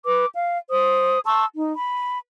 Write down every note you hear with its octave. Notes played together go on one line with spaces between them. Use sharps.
B4 D6
F5
C5 D#6
A5 C6 C#6 E6
D#4
B5